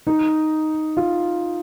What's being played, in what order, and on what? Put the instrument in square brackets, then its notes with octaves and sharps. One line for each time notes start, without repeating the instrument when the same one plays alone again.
[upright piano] D#4
F4